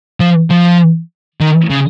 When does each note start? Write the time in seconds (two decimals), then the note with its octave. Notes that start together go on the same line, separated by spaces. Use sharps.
0.20 F3
0.50 F3
1.40 D#3
1.70 C#3